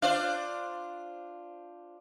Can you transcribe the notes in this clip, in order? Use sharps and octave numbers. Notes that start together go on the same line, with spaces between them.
D4 F4 C5 F5